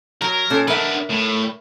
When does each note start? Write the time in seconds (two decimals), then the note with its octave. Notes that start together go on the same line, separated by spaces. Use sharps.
0.22 F#3 A#4
0.50 A#2 C#4 A4
0.68 B3 D4 A#4 E5
1.11 A2